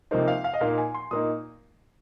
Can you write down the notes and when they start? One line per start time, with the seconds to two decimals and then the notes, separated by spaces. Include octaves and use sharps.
0.11 C3 F3 A#3 D#4 C5
0.28 F5
0.44 F5
0.54 D#5
0.61 A#2 A#3 D#4 F5
0.78 G#5
0.95 C6
1.11 A#2 A#3 D#4 D#6